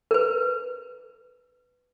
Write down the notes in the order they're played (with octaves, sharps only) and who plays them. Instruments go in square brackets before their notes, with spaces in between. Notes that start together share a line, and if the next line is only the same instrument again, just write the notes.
[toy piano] A#4 B4